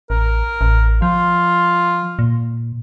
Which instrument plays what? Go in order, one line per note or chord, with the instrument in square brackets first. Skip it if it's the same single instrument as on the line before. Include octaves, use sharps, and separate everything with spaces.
[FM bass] A1 [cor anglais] A#4
[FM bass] A1
[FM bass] F3 [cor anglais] F4
[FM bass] A#2